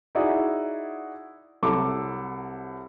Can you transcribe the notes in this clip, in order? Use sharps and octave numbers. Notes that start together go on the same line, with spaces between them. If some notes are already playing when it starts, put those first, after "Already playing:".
D#4 E4 F#4 G#4 D5 E5
C2 F#3 A4 D6